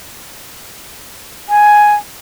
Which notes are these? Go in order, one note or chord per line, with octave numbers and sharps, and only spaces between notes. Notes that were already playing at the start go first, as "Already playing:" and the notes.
G#5